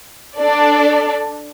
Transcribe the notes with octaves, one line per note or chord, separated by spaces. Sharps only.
D4 A4 D5